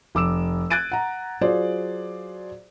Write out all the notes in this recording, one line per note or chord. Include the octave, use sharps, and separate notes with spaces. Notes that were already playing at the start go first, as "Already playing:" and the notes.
F1 D6 E6 E7
F#6 G#6 A6 D7 D#7
F#5 A#5
F#3 F4 G#4 C5 D5